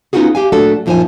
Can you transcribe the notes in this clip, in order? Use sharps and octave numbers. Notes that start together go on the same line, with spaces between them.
B3 C#4 D#4 F4 F#4 G#4
G4 F5 G#5
A#2 F#3 A3 D4 F#4 A4
F#2 A#2 F3 D#4 C5 G#5